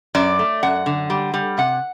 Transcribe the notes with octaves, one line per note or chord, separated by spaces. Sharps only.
F#2 D5
A3
F#2 F#5
D3
G3
G3
C3 F#5